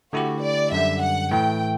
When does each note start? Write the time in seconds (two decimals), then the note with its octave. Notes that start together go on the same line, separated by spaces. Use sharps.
0.13 D3 A3 E4 F#4 G4
0.42 D5
0.72 F#2 D3 G3 E5
1.02 F#5
1.31 A2 E3 A3 G5